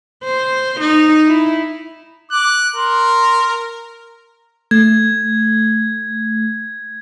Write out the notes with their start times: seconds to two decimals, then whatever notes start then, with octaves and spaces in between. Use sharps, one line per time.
0.24 C5
0.80 D#4
1.27 E4
2.32 D6 F#6
2.76 A#4 C6
4.71 A3 G#6